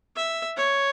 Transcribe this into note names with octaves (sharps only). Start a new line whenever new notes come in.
E5
C#5